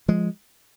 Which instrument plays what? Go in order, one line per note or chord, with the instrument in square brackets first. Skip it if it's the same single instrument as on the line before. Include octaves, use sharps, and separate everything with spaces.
[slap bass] F3 G#3